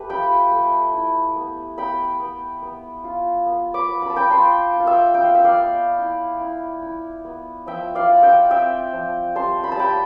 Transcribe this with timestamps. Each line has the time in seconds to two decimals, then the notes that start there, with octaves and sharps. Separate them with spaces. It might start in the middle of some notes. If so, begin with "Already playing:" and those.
Already playing: A3 G4 B4
0.10 F4 G5 B5
0.51 A3
0.93 E4
1.36 B3
1.78 B3 G5 B5
2.20 B3
2.62 B3
3.04 F4
3.46 B3
3.74 B5 D6
3.89 B3
4.02 B5
4.10 A5
4.16 G5 B5
4.30 F4 A5 C6
4.73 F4
4.80 F5
4.86 E5 G5
5.14 B3 G5
5.24 F5
5.35 E5
5.44 D5 F5
5.57 B3
5.98 E4
6.41 E4
6.82 E4
7.25 B3
7.66 F3 E5 G5
7.95 D5 F5
8.09 F4
8.23 E5 G5
8.51 C4 E5 G5
8.93 F3
9.35 G3 A5 C6
9.64 B5
9.72 A5
9.77 G3 G5 B5